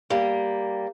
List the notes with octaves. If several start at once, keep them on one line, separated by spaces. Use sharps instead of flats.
G3 A#3